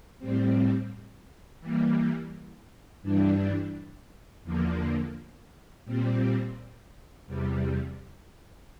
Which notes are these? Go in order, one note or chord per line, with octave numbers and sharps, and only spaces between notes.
A2 G3 C4
E3 G3 A#3
G2 E3 G3 D4
E2 D3 F3 A#3
A#2 G3 C4
E2 C3 G3